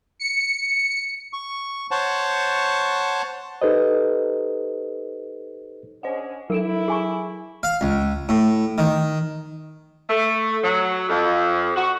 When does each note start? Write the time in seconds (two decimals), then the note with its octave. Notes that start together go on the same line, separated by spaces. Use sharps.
0.20 C#7
1.33 C#6
1.91 C5 C#5 F#5 A5
3.62 D#4 G4 A4 B4 C5 D#5
6.03 C#4 D4 G#4 C5 D#5 F#5
6.50 F#3 E4 A4 A#4 D7 E7
6.88 G#4 G#5 C#6
7.63 F5
7.81 C#2
8.29 A2
8.78 D#3
10.10 A3
10.64 F#3
11.09 F2
11.76 F#4